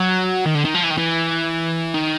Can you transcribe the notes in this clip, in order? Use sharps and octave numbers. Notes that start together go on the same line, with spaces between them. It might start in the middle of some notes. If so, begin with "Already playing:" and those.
Already playing: F#3
D#3
D3
D#3
F3
E3
D#3
E3
D#3